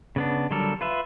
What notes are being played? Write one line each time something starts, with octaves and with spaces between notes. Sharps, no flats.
C#3 B3 D4
D3 F#3 G3 A4 A#4
F4 B4 E5